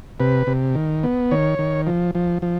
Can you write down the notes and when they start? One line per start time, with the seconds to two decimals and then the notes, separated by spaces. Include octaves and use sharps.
0.20 C3 B4
0.47 C3
0.75 D#3
1.03 B3
1.31 D#3 C#5
1.59 D#3
1.87 F3
2.15 F3
2.42 F3